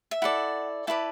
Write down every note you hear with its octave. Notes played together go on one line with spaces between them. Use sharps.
E5
E4 A4 D5 F#5
E4 B4 D5 A5